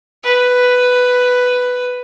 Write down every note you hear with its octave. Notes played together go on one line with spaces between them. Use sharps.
B4